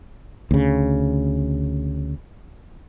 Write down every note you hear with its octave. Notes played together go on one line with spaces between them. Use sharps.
D2 C#3